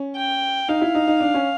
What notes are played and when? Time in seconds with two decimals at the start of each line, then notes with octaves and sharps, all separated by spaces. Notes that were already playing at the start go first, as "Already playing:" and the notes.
Already playing: C#4
0.16 G5
0.68 D#4 F5
0.81 E4
0.95 D#4
1.07 D#4
1.20 D4
1.34 C#4